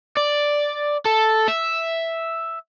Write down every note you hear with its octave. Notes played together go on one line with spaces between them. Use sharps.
D5
A4
E5